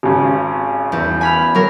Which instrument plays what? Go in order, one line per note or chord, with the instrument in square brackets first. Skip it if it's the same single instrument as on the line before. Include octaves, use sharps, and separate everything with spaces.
[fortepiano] G#1 C#3
[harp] E2
G#5 B5 F6
F#3 A#4